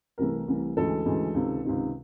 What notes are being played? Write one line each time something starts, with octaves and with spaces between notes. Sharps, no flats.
C2 C3 E3 A3 A#4
C2 C3 E3 A3
D2 C#3 E3 G#3 A4
D2 C#3 E3 G#3
C#2 C3 D#3
C#2 C3 D#3